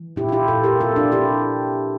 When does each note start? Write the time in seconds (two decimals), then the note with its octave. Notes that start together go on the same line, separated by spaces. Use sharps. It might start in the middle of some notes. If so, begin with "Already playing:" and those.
Already playing: E3
0.16 A#2 E4 G4
0.29 F4
0.32 E4 G4
0.48 A#2 F4 A4
0.64 G4 A#4
0.80 C3 F4 A4
0.96 D4 F4
1.12 C3 E4 G4